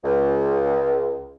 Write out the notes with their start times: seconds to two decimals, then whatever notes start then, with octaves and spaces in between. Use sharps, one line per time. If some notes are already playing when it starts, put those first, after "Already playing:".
0.04 C#2